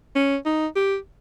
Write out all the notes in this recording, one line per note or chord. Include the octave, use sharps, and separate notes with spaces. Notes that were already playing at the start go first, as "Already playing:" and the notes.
C#4
D#4
G4